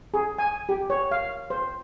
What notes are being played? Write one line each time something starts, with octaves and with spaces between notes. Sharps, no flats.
G#4
G#5
G4
C#5
F5
C5